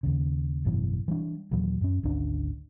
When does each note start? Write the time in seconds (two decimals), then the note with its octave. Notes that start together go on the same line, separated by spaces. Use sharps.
0.03 D#2 C#3
0.65 G#1 F#2 B2 E3
1.08 E3 G3 D4
1.51 D#2 A#2 E3 F#3
1.81 F#2 C#4
2.03 G#1 D2 C#4 D4